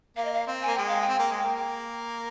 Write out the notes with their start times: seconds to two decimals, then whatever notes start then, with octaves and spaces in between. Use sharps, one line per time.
0.17 A#3 F5
0.25 D#5
0.33 F5
0.47 C4
0.63 G#5
0.68 A#3
0.75 G#3 G5
0.88 F5
1.01 G5
1.09 C4
1.19 A#3
1.30 G#3
1.42 A#3